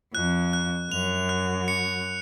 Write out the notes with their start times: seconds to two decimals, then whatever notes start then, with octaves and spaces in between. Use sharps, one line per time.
0.14 F2 F#6
0.53 F#6
0.92 F#2 F7
1.29 F#6
1.68 C#7